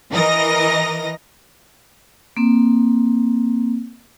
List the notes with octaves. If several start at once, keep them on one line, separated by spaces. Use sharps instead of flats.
E3 A#4 D#5 A#6
A#3 C4